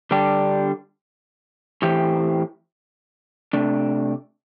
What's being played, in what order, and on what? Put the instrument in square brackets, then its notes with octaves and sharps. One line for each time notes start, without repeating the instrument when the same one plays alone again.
[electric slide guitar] D3 G3 D4 G4
A2 E3 C4 G4
C3 A3 D4